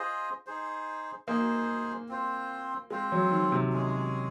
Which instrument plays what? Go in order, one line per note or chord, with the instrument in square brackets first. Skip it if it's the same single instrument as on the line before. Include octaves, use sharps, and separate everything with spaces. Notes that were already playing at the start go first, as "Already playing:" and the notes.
Already playing: [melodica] F4 G#4 C5 D#5
D#4 G#4 C5
[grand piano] A#3 [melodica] D#4 G#4 C5
[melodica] C4 F4 C5
[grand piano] G#3 [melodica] C4 F4 C5
[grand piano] F#3
D#3
C3
[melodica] G#3 C#4 G#4